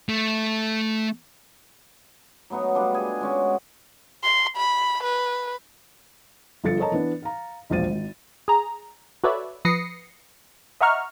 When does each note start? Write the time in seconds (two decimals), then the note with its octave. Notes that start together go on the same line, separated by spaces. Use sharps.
0.09 A3
2.50 F#3 A3 B3 D#4
2.74 G3 B3 D4 F4
2.94 G#4
3.21 G#3 C#4 F#4
4.23 C6
4.57 B5
5.03 B4
6.64 G1 F3 A4 A6 C#7
6.79 A4 A#4 C#5 D#5 A5 A#5
6.92 E3 B3 D4
7.22 F5 A#5
7.70 E1 A#1 C5 F5 A6 D#7
7.89 G#1
8.48 G#4 A#5
9.24 F#4 A4 B4 C#5 D5 E5
9.65 F3 B4 D#6 A#6 C7 C#7
10.81 D#5 E5 F#5 A#5 C#6 F6